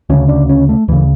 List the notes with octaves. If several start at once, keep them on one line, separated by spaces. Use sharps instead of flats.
D2 C#3 C#4
D4
C#4
A3
D2 C#3 E3